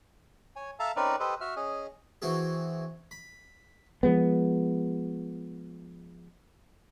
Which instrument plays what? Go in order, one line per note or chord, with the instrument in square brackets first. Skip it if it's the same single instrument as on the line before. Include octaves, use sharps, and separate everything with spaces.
[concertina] C#5 G#5
A4 E5 F5 A5 A#5
C4 C#4 D#4 A#4 B4 D5
G4 A4 B4 C5 D#5
F#4 E5 F6
C#4 G#4 D#5
[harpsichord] E3 C4 F#4 G#4
B5
[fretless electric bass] F3 G#3 B3